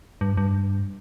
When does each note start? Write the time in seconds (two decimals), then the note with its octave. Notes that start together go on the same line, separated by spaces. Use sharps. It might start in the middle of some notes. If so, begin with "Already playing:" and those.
0.21 G2
0.37 G2